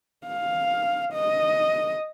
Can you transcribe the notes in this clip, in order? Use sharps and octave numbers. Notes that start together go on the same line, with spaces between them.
F5
D#5